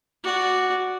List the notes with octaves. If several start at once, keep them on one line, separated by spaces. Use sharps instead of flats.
F#4 D5